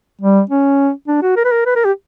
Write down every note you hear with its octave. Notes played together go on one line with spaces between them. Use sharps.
G3
C#4
D4
F#4
A#4
B4
A#4
B4
A#4
G4